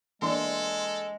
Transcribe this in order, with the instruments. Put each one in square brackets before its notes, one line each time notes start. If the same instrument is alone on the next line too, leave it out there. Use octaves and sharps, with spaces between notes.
[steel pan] E3 A#3 D4 [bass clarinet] G#3 [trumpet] A4 [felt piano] C6